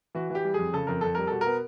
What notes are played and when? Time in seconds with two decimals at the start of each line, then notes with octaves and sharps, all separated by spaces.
0.15 E3 F#4
0.30 E3 G4
0.45 G3
0.54 F2 G#4
0.73 C#3 A4
0.87 F2 A#4
1.01 F2 A4
1.15 G3 A#4
1.27 B2 A4
1.41 A#4
1.46 B3